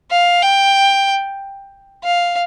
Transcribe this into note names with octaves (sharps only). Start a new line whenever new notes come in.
F5
G5
F5